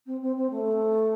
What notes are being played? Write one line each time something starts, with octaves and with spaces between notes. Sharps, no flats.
C4
C4
C4
A3